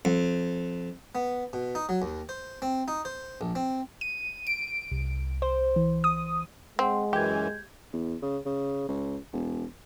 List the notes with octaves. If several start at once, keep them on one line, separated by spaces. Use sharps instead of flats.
F2
B3
B2
D#4
F#3
D#2
C5
C4
D#4
C5
A#1
C4
D#7
D7
C2
C5
E3
D#6
G#3 C4 F#5 C6
F#2 E3 G4 G6 G#6
E2
C#3
C#3
C#2
E1